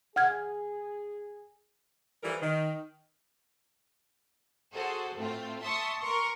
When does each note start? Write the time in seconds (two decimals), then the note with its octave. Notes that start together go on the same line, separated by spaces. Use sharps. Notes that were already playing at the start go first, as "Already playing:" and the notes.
0.16 G#4 F#5 F6 G#6
2.23 E3 F3 G3 A4 A#4
2.41 D#3
4.73 F#4 G#4 A4 C5
5.16 A2 A3 C4 F4
5.60 E5 A5 C6 C#6 D#6
5.99 A#4 C6 C#6